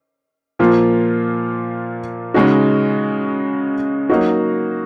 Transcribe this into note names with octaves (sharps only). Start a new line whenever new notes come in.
A#2 F3 A#3 F4
C#3 G#3 D#4 F#4
F#3 A#3 D#4 F#4